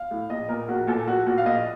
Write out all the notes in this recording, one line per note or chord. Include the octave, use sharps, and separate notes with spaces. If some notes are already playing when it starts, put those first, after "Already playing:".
Already playing: F5
A2
A#1 D#5
A#2 A#4
A#1 F#4
A#2 A4
A#1 F#4
A#2 F#4
F5
A#1 D#5